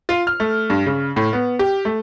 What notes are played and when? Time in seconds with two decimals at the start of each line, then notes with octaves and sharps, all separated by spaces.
0.09 F4
0.27 F6
0.40 A3
0.70 G2
0.86 C#3
1.16 A2
1.33 B3
1.59 G4
1.85 A3